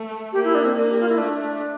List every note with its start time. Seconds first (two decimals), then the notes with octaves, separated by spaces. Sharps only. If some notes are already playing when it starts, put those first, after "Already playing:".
Already playing: A3
0.33 A#3 G4
0.44 E4
0.55 D4
0.65 C4
0.76 A#3 D4
0.91 G4
1.00 F4
1.09 E4
1.18 A3 D4